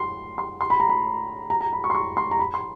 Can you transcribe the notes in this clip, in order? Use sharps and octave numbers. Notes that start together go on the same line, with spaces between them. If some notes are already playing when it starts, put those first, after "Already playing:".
Already playing: C6
C6
C6
B5
A#5
B5
A#5
A#5
B5
C#6
C6
C#6
C6
A#5
B5
C6